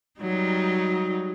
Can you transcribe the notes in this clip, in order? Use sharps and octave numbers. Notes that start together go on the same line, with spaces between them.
F#3 G3 D#4